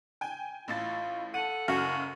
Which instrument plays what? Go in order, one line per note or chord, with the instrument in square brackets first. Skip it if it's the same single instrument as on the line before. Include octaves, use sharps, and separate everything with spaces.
[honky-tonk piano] G5 G#5
[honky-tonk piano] A1 A2 A6 [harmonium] F4
[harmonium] A4 [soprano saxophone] F#5 [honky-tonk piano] D#7
[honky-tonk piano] F#1 F#2 F5 [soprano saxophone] F#4